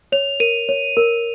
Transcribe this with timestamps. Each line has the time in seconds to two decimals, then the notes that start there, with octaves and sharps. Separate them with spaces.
0.12 C#5 F7
0.40 A#4 D#7
0.69 C#5
0.97 A#4